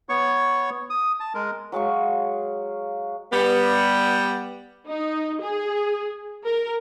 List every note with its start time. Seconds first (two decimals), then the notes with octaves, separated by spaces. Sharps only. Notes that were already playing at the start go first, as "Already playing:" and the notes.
0.09 B3 C#5 C#6
0.90 D#6
1.20 A5
1.34 G#3 A#4
1.72 F#3 G#3 F5 C#6
3.33 G3 B3
4.86 D#4
5.41 G#4
6.45 A#4